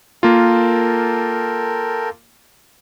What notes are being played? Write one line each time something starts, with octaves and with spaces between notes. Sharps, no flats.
A#3 F4 A4 A#4 G5